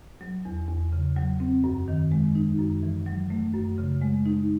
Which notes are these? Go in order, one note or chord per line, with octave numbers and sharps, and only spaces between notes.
F#3
E2
E2
C#3
F#3
C4
F#2
D#3
G#3
D#4
F#2
E3
F#3
A3
F#2
C#3
G#3
D#4